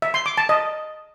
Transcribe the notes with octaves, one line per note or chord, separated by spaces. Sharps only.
E5
C6
D6
A5
D#5